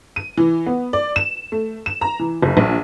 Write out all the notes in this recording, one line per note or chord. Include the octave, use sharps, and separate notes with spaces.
D#7
E3
B3
D5
E7
A3
E7
A#5
E3
F#1
A#1